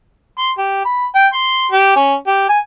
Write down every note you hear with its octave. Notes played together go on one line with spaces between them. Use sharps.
C6
G4
B5
G5
C6
G4
C#4
G4
G#5